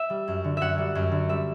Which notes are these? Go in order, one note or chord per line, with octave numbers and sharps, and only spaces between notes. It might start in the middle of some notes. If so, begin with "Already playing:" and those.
Already playing: E5
G3
F#2
D3
F#2 E5 F#5
G3
F#2
D3
G3 E5